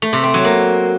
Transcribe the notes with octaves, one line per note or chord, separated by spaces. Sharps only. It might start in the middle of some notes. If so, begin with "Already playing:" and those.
A3
C3
C4
F#3
A#3